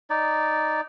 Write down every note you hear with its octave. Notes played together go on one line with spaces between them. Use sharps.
D#4 D5